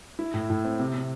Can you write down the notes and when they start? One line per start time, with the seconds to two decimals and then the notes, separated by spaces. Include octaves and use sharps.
0.19 E4
0.34 A2
0.50 A2
0.65 C4
0.79 C3
0.94 C3